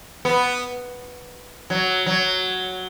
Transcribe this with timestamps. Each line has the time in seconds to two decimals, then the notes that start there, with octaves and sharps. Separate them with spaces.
0.25 B3
1.70 F#3
2.06 F#3